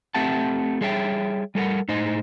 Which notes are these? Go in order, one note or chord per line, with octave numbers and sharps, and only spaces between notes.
A3 C4 G4 E5 F#5 A5
G3 G#4 C#5 E5 G5
G3 A4 A#4 F#5
A2 D#4 C5 D#5